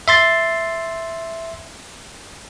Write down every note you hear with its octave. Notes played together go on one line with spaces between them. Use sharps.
E5 C6 A6